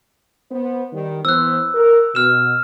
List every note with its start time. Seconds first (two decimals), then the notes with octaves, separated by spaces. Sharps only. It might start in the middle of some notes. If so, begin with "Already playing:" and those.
0.52 B3 C5
0.93 D#3 G3
1.25 E3 B3 C5 E6 F#6
1.74 A#4
2.15 B2 F6 E7